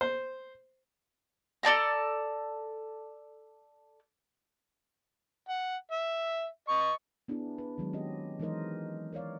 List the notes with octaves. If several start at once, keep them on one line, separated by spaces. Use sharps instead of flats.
C5
A4 D5 A5 A#5
F#5
E5
D#5 C#6
B3 D4 E4 G#4
B4
D#3 F#3 G#3
C4 C#4 G4 D#5
E3 G#3 D#4 A#4 C5 D#5
A#4 C#5 D5 F5